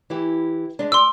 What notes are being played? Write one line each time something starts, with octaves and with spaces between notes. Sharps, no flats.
E3 E4 G4
G#3 D4
D5 C6 E6